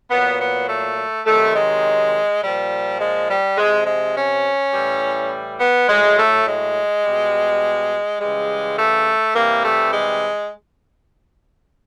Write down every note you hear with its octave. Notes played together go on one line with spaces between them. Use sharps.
A#2 F#3 B3
B3
A3
C3 D#3 F#3 A3
G#3
A#2 F3 G3
G#3
G3
C3 F3 G#3
G#3
C#4
A2 E3 G3
B3
A2 F#3 G#3
A3
G#3
B2 G3
C#3 E3 G3 G#3
A3
C3 E3 G3 A#3
A3
G#3